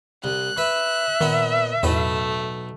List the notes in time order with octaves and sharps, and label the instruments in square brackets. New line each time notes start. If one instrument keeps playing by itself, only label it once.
[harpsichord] C2 [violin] F#6
[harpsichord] B4 [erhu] E5
[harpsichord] A#2 B3 [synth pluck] D#3
[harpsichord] B1 B4 [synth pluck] E2 A2 [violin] A3